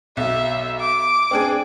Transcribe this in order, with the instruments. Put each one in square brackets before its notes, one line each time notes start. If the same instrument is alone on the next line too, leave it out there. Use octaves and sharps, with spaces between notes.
[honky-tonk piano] B1 [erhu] E5
[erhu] D6
[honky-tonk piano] C4 D4 G#4